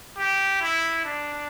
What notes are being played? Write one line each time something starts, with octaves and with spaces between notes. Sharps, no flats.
G4
E4
D4